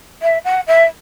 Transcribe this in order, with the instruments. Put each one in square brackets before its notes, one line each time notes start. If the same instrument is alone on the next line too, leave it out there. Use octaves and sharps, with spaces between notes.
[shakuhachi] E5
F#5
E5